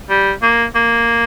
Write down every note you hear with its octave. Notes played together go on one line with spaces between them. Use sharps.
G3
A#3
A#3